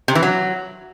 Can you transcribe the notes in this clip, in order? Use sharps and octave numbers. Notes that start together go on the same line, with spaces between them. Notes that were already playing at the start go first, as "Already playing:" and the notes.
C3
E3
F#3